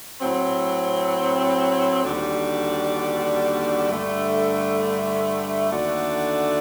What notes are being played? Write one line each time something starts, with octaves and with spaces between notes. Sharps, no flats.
A2 F#3 C4
D#2 D3 G3 D4 F#4
G2 D3 A3
D#2 D3 A3 D4 F#4